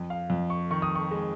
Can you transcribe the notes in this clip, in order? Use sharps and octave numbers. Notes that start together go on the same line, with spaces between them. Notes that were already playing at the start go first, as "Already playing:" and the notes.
Already playing: F2
F5
F2
C#6
D#3 C#6
D#6
C#6
G#3